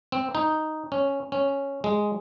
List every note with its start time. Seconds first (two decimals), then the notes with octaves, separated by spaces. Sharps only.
0.12 C4
0.35 D#4
0.92 C#4
1.32 C#4
1.84 G#3